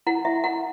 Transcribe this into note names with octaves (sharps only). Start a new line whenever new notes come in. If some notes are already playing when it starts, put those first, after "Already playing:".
E4 F#5
E4 E5
E4 F#5